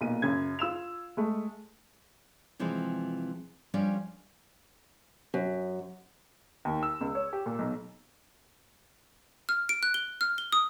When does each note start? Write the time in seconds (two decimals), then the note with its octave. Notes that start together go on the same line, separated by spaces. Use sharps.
0.01 B1 A#2 D#7
0.22 F#2 C#3 G#6
0.59 F4 E6 E7 F7
1.17 G#3 A3
2.59 C3 E3 F3 G#3 C4
3.74 F3 G3 C#4 D4 G4 D5
5.34 F#2
6.65 D#2
6.83 E6
7.01 C#2
7.15 C#5
7.33 G4
7.46 A#2
7.59 B1
9.49 F6
9.69 D7
9.83 F#6
9.94 G7
10.21 F6
10.38 G7
10.52 D#6